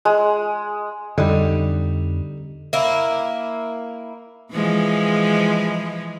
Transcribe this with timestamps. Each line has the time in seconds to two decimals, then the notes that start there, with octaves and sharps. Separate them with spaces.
0.05 G#3
1.18 F2 D3 G3 D#4
2.73 A#3 E4
4.53 E3 F3 G#3